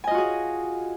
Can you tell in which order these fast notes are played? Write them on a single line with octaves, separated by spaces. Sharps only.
G#5 D#5 F4 F#4 G#4